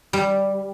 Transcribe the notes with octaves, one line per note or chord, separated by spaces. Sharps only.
G3